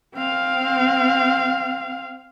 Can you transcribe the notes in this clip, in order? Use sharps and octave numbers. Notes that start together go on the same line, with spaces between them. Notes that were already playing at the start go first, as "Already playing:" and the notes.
C4 F5